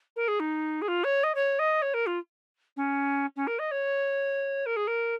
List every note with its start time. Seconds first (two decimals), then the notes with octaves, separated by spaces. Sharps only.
0.16 A#4
0.28 G#4
0.40 D#4
0.82 G#4
0.88 F4
1.04 C#5
1.23 D#5
1.35 C#5
1.59 D#5
1.82 C#5
1.94 A#4
2.06 F4
2.77 C#4
3.36 C#4
3.47 A#4
3.59 D#5
3.71 C#5
4.66 A#4
4.76 G#4
4.87 A#4